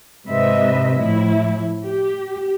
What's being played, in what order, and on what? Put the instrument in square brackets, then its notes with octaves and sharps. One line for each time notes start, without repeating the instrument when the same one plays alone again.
[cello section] G#2 C3 C4 B4 D#5 E5
A2 F3 E4
G4